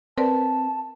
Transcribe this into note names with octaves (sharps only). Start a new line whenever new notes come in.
C4 A#4 B4 D5 A5